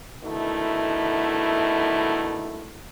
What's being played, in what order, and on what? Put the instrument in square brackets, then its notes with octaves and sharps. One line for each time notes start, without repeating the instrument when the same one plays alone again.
[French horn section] B2 D3 D#3 A3 E4